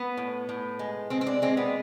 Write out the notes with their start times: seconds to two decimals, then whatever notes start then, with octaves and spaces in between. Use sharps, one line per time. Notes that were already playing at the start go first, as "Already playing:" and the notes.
Already playing: B3
0.17 A2
0.49 A2
0.79 G#3
1.10 G#3 C4
1.21 C4
1.27 D4
1.42 G#3 C4
1.57 B3